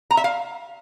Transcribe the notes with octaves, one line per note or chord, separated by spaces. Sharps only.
A#5
E5
F5